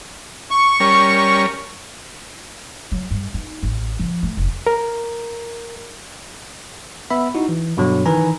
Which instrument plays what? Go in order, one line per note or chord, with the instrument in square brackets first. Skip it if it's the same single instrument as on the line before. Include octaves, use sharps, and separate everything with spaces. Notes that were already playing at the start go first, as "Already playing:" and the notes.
[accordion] C#6
[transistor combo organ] G3 C#4 A#4
[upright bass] F#3
G2
D#4
A1
F3
A3
F1
[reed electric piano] A#4
[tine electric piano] B3 E5 B5
D#4 E4 F#4
E3
G2 B2 D3 F#3
D#3 E3 B4 G#5 A#5